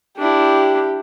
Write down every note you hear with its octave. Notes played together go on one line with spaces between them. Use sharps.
D4 E4 G4